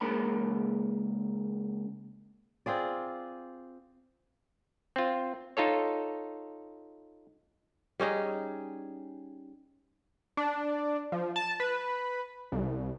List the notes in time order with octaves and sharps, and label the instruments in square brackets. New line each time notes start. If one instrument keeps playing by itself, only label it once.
[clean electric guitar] C#2 C#3 A#3 B5
[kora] C4 F4 G#4 D5
[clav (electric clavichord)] C4 F4
D#4 F4 A4 C#5
[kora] G3 C#4 D#4 G#4
[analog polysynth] D4
F3
A5
B4
C2